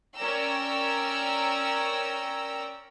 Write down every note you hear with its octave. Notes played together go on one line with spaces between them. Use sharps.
C#4 A#4 D5 G5 A#5 E6